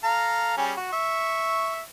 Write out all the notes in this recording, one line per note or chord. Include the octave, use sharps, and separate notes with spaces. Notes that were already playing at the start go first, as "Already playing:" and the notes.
A4 F5 A#5
G3 C#4 G#4
F#4
E5 C#6